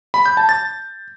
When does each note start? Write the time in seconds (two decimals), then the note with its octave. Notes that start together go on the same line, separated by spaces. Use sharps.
0.14 B5
0.26 G6
0.37 A5
0.49 A6